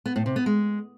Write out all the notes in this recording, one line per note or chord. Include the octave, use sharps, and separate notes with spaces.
B3
A2
C3
B3
G#3